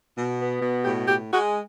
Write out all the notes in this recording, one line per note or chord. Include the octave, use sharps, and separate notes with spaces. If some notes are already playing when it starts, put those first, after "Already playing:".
B2
B3
B2
A2 G4
A2 G4
G#3 F#4